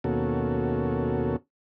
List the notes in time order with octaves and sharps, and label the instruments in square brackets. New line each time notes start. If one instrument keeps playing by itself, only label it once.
[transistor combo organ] D#2 B2 A#3 C#4 F#4 A4